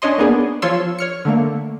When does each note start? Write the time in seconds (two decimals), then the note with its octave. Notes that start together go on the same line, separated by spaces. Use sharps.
0.02 C#4 D4 C#5 D#5 C6
0.18 A#3 B3 D4 G#4
0.62 F3 F4 C#5 C6 E6
0.98 C#5 F6 C#7
1.25 D3 A3 A#3